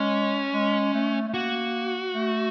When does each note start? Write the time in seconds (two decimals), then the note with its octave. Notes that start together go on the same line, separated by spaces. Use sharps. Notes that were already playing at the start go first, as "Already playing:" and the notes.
Already playing: G#3 C#4
0.53 G#3
0.94 A3
1.28 A3
1.34 A#3 F#4
2.14 A3